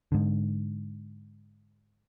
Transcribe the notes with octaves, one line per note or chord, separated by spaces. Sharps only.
G#2 D3